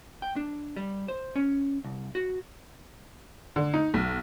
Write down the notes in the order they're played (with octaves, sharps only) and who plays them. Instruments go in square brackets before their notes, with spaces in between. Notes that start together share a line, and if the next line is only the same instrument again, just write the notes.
[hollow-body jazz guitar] G5
D4
G3
C5
C#4
C2
F#4
[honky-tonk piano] D3
D#4
B1